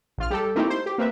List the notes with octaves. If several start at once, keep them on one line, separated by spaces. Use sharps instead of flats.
A#1 F4 F6
G3 G4 A4
A3 A#3 C4 D#4 E4 G4
C5
G4
A#3 C4 B4 E5